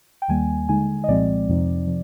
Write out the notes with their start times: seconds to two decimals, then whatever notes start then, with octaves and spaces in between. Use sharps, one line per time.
0.22 G5
0.28 D#2 D#3 G3 A#3 G#5
0.69 D3 G#3 D#4 G#5
1.04 D#5
1.08 C2 A#2 F3 G#3 C4 D5
1.48 F2 C3 F3 C4 D#4
1.87 C3 F3